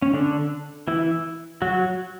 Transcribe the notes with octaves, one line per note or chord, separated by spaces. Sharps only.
C#4
D3 D4
E3 E4
F#3 F#4